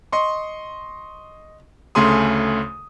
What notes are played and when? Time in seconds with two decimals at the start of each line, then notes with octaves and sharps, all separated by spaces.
0.12 D#5 C6 C#6
1.95 D2 C#3 A3 G#4 C6 D#6